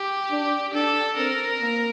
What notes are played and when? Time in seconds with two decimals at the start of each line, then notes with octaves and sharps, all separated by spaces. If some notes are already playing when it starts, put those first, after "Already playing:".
Already playing: G4
0.31 D4
0.74 D4 A4
1.17 C4 A#4
1.61 A#3